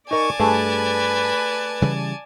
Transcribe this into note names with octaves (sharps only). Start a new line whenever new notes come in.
D#4 A#4 D5 G#5 A5 C#6
G2 A3 G#4 B4
C#3 E3 G3